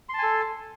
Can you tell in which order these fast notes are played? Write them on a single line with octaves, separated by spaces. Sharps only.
C6 A5 G#5 A4